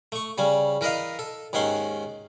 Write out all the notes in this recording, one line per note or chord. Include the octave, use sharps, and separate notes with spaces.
A3 C#6
C#3 G3 C#4
E3 A#4 B4 D#5 F5
A4
D#2 G#2 D#3 C#4 F#5 C6